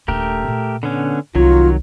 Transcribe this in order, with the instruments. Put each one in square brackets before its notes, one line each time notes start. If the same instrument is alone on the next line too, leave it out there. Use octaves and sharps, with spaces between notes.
[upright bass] D#1 D4 [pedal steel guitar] A3 G4 A#4
[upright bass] A#2
[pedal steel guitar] D3 B3 C#4
[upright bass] C2 [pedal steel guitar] D#3 F#3 C#5 [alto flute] F4